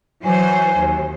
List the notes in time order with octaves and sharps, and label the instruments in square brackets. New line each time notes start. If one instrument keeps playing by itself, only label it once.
[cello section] E3 F#3 C5 [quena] G#5
[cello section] D#2